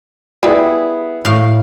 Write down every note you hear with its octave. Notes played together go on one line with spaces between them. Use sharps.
G3 B3 E4 G#4
A2 F5